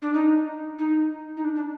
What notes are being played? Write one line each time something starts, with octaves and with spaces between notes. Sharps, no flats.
D4
D#4
D#4
D#4
D4
D4